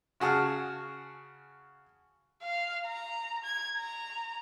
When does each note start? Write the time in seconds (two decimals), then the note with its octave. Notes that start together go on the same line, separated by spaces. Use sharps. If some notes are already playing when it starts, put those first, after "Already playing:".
0.20 C#3 F#4 G#4 A5 F6
2.42 F5
2.86 A#5
3.44 G#6
3.77 A#5